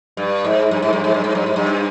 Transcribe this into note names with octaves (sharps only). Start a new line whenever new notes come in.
G2
G#2
G2
G#2
G2
G#2
G2
G#2
G2
G#2
G2